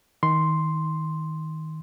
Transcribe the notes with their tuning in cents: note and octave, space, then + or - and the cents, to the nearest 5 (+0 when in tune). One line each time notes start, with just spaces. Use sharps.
D#3 +20 C6 +0